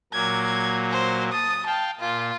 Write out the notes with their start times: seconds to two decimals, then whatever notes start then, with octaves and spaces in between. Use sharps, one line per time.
0.13 A#2 F#3 A#3 G#6
0.91 C5
1.32 A5 D#6
1.66 F5 G5 A5
2.00 A#2 F4